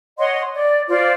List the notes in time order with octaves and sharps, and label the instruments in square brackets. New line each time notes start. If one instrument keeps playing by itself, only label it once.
[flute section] C#5 D#5 F#5 C6
D5
F4 C5 D5